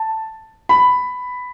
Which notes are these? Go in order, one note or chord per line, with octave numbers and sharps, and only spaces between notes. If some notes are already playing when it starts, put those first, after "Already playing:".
Already playing: A5
B5